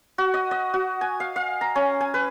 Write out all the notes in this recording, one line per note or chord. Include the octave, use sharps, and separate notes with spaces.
F#4
D#5
D#5
F#4
G#5
F5
F5
A#5
C#4
G#5
B4